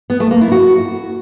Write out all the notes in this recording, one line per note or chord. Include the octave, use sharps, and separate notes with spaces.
B3
A3
A#3
E4
F#4